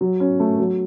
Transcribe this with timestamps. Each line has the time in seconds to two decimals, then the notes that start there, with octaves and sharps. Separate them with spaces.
0.01 F#3
0.20 C#4
0.40 A3
0.59 F#3